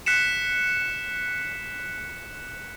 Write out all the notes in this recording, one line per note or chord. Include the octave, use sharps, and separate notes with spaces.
F#6 B6 C#7 E7